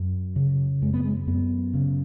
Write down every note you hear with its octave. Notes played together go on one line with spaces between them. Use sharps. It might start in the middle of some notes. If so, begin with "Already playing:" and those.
Already playing: F#2
C#3
F#2 G#3
B3
G#3
F#2 B3
C#3